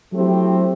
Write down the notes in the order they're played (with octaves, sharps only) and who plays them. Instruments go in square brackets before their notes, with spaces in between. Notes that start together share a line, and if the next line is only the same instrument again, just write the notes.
[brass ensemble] F#3 A3 C4 E4 G4